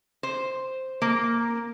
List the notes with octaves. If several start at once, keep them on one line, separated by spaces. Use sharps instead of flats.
C5
A#3